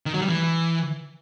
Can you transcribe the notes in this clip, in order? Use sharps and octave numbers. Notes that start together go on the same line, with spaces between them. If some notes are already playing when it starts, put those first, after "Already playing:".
D#3
F#3
G3
E3